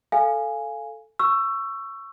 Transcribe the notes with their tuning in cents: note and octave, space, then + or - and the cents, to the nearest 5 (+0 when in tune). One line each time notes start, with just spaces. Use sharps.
A4 +0 F5 -10 G#5 +0
C#6 +0 E6 +25